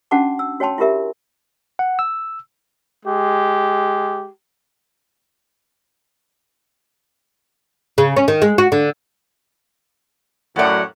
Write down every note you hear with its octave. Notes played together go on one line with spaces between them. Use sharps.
C#4 D4 F#4 F#5 A5 D6
E6
F#4 C#5 G5 A5 C6
E4 F4 G4 A#4 E5
F#5
E6
G#3 G4
C#3
C#4
D#3
G#3
F#4
D3
F#2 A2 F#3 D5 F#5